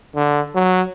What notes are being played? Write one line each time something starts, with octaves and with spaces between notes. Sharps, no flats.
D3
F#3